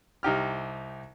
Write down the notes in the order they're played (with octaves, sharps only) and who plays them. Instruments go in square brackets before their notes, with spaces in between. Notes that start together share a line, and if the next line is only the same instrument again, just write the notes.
[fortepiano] C2 D#4 G4 F6